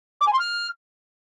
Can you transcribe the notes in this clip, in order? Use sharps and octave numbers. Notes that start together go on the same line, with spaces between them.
D6
G#5
C6
F6